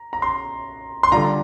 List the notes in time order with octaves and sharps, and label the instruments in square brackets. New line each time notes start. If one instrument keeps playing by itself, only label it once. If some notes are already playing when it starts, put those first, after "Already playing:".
Already playing: [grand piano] A#5
A#5
C6
C6
[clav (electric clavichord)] D3 G3 D4 F4 [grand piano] A#5